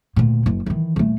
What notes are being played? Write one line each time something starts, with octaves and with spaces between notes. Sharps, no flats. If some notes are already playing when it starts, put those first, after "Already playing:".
D2 A#2
F#1
D#3 E3
D#1 A3